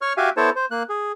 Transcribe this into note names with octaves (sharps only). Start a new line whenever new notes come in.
C#5 C#6 F6
F#4 G4 E5 F5 G#5
B3 E4 A4 C5 C#5 A5
C5
A#3 F#6
G#4